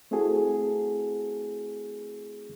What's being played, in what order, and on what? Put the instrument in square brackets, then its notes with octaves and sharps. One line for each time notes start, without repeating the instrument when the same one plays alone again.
[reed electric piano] A3 C4 E4 F#4 G#4 A4